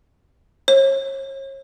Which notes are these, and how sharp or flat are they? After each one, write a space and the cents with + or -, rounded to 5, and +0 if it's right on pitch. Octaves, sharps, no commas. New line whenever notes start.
C#5 -40